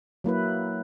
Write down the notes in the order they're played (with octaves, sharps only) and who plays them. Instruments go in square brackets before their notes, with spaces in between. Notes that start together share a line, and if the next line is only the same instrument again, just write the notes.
[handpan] F#3 A#3 E4 B4